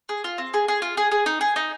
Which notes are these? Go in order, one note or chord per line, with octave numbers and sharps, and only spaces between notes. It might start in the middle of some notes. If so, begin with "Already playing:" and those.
G#4
F4
C4
G#4
G#4
F4
G#4
G#4
D#4
G#4
D#4